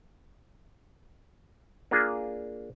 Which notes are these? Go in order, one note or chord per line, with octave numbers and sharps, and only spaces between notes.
A#3 D4 F4 G#4